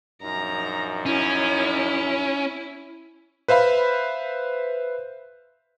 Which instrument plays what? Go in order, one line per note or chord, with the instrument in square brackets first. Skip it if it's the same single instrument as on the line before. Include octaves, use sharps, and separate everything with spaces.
[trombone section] A#1 F#2 D#4 [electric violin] A#5
[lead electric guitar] C#4 [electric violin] E4
[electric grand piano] B4 C5 E5 F5 B5